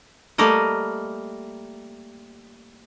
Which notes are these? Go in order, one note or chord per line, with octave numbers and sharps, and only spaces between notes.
G3 A3 A#3 A#4 D#5